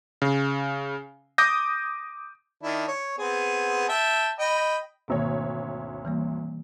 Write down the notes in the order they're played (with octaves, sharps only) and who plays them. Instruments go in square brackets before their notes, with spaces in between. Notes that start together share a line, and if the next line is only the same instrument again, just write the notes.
[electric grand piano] C#3
D6 D#6 G6 A#6
[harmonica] D#3 D4 E4
C#5
B3 C4 G#4
E5 G5 A5
D#5 G5 B5
[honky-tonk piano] G#1 D2 C#5 [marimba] B2 D#3 A#3
[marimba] E3 G3 A#3